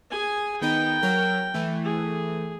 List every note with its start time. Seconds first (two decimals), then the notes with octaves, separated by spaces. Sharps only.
0.11 G#4 G#5
0.62 D#3 B3 D#4 G5
1.03 F#3 A#4
1.54 E3 A3
1.84 G#4